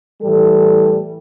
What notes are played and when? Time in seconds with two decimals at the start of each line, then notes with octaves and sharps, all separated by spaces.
0.22 A2 E3 G3 A4